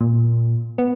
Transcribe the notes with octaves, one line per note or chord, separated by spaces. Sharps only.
A#2
B3